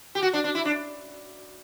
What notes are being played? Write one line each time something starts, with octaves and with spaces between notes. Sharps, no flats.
G4
F#4
D4
D4
E4
D4